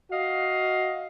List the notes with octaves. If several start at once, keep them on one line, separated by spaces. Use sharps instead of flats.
F#4 D#5 F5